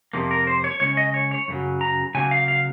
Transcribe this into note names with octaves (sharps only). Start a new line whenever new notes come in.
F2 C3 F3 A#3
A#4
C5
C#5
C#3 G#3 C#4 C#5
D#5
C#5
C#5
F#2 C#3 F#3
A#5
C#3 F#3 A#3 G#5
F5
F5